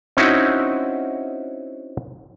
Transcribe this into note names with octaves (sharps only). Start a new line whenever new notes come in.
C4 C#4 D#4 E4 F#4